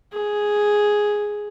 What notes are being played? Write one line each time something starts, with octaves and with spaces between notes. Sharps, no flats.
G#4